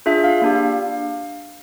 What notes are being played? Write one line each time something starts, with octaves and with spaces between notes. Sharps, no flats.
D4 F4 G#4 E5
F5
A#3 D4 G4